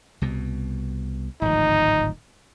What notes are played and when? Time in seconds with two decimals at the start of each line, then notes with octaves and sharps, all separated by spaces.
0.22 C2 B2
1.42 D1 G#1 F3 D#4